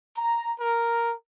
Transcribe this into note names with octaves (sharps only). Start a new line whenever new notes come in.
A#5
A#4